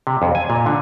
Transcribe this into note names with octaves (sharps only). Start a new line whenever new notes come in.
C3
F2
G#5
A#2
D3